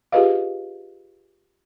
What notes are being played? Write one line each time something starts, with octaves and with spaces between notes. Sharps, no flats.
F4 G4 G#4 B4 D#5 F5